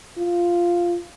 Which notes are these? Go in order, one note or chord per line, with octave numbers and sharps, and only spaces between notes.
F4